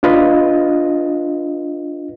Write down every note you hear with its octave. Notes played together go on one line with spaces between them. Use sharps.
D4 F4 B4 D#5